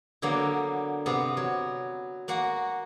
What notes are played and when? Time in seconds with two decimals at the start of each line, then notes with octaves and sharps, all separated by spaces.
0.22 D3 F#3 A#3 B3
1.06 C3 B3
1.37 F#3
2.28 A#3 F#4 F#5